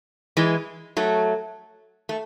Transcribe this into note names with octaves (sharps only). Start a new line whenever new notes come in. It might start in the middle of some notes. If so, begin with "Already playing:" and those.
E3 G#3
F#3 A3
A3